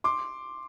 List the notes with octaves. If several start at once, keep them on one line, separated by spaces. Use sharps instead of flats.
C6 D6